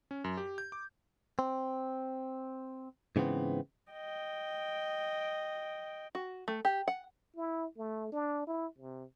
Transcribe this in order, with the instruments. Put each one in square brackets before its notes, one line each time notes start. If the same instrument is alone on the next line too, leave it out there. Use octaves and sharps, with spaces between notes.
[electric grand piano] C#4
F#2
G4
G6
D6
[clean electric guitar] C4
G#2 C#3 E3 B3 C4
[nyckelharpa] D#5 G5
[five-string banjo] F#4
A3
G4
F#5
[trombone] E4
A3
D4
E4
C3